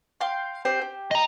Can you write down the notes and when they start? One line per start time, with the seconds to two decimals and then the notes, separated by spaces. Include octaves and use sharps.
0.20 F5 G5 C6
0.65 C4 G4 C5
0.81 G4
1.11 D#5 A#5